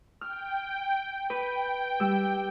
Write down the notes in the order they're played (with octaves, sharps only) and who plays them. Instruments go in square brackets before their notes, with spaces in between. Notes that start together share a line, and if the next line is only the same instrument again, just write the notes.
[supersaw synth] G5 [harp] F6
[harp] B4 [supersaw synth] G5
[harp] G3 E6